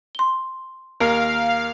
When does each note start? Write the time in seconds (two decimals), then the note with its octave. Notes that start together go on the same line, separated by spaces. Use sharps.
0.15 C6 G7
1.00 D#2 A#4 F5